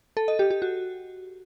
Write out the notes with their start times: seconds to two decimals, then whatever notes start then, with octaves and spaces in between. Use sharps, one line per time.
0.17 A4
0.28 D#5
0.39 G4
0.51 G4
0.62 F#4